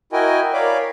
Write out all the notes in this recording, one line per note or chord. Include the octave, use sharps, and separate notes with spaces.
E4 F#4 A#4 D#5 G5 G#5
A#4 C#5 D5 F5 B5 D6